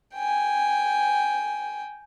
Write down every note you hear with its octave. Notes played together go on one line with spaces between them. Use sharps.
G5 G#5